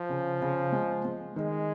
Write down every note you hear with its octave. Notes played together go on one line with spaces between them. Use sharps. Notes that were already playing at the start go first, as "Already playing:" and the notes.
Already playing: F3
C#3
C#3
G#3
G#3
D#3 G#3